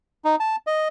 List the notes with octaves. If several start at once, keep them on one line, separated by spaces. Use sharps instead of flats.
D#4
A5
D#5